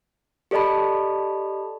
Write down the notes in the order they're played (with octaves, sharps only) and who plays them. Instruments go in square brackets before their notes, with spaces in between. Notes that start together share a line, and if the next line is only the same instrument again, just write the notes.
[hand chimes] G4 A4 D5 D#5 A5 B5